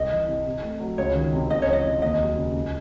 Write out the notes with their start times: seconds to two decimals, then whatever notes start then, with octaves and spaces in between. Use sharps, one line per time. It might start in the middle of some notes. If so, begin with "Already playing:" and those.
Already playing: C2 D#5
0.11 E3
0.28 C3
0.46 C3
0.63 A3
0.80 F#3
0.98 C#2 C#5
1.15 D#3
1.33 C3
1.50 C#2 D#5
1.62 C#5
1.67 E3
1.73 D#5
1.85 C3
2.02 D#2 D#5
2.19 F#3
2.37 C#3
2.54 C#2